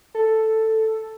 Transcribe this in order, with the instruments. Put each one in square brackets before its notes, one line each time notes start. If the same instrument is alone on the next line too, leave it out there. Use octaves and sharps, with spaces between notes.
[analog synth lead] A4